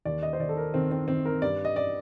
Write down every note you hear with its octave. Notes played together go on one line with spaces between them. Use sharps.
D#2 D5
D#5
C5
D#2 D5
A4
A#4
D#3 C4
C4
D#3 C4
A#4
G2 D5
D#5
D5